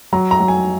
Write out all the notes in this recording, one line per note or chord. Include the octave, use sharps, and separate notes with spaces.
F#3 A#5
A#5
F#3
G#5